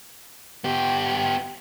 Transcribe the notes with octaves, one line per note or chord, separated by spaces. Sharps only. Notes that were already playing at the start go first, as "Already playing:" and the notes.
B3 G4